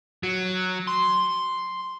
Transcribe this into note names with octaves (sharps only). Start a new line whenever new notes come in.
F#3
C6